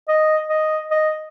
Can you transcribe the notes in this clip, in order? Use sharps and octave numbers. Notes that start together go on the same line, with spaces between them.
D#5
D#5
D#5